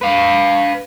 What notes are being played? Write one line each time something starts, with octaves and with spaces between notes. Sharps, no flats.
B4 F5